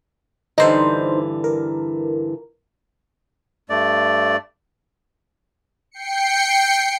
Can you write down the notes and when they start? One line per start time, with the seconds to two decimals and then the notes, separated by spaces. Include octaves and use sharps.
0.58 G2 D3 E3 D#4 C5
1.44 A#4
3.70 G2 A3 D5
5.91 G5 C7 C#7